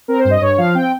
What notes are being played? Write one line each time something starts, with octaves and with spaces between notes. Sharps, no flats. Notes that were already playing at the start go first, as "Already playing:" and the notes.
C4 A#4
C5
G2
D#5
G2 C#5
F3 F5
C4 G5